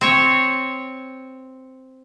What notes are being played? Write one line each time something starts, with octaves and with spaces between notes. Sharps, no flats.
C4 C#5